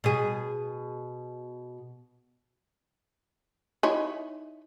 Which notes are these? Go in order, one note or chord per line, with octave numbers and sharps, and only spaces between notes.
B2 G#4
D#4 E4 C#5